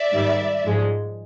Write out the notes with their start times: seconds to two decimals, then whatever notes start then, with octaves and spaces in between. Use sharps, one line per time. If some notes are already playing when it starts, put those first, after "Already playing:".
Already playing: D5 E5
0.12 G#2 D#3 G3
0.63 G#2 F3 G#3